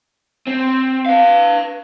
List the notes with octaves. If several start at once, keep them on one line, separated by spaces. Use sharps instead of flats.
C4
B4 F5